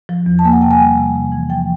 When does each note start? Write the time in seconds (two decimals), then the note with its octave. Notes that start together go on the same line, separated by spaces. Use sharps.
0.09 F3
0.26 E2
0.39 A5
0.44 A#3 G#5
0.53 F#5
0.62 C3 G5
0.71 G#5
0.80 G3
0.97 C3
1.16 C3
1.32 E3
1.50 F3 G5